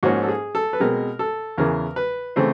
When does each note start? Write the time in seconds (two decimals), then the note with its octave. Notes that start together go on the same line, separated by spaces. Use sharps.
0.03 G#2 F3 A#3 C#4 F#4
0.23 A4
0.29 G#4
0.55 A4
0.73 B4
0.80 B2 G#3 C4 A#4
1.19 A4
1.58 E2 C#3 E3 A#4
1.96 B4
2.36 C#3 E3 A3 C4 C5